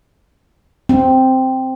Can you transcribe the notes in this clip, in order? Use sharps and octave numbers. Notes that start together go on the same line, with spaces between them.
C4